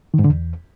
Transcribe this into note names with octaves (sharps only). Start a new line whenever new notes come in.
D#3
G#2
D3
E2